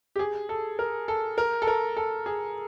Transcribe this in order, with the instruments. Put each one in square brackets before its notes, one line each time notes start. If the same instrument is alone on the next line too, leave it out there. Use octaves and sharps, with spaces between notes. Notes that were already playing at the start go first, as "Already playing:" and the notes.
[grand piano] G4
G#4
A4
A#4
A4
A#4
A4
A#4
A4
G#4